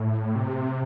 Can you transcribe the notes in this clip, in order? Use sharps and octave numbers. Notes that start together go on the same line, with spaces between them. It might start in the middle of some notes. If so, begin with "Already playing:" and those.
Already playing: A2
C3